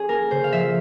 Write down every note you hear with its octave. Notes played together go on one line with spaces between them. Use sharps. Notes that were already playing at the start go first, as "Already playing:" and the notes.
Already playing: C#4 G#4
A#3 A#4
C#3 C5
F5
F3 E5